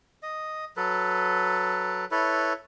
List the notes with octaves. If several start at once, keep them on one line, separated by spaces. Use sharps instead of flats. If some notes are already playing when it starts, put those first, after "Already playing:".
D#5
F#3 A4 B4
E4 A4 B4 C#5